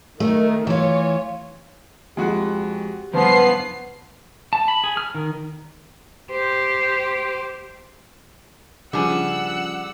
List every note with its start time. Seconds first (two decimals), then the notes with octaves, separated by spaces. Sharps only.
0.20 D#3 A3
0.67 E3 F4 C#5
2.17 F2 G#3 F#4 G4
3.14 F#1 G2 F3 B3 B4 C7
4.53 A5
4.68 B5
4.84 G#4
4.97 F6
5.15 D#3
6.32 G4 C5
8.93 C#3 F3 G3 D4 G#4 F#5 E6